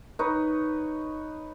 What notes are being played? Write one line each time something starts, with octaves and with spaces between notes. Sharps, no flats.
D#4 B4 C#5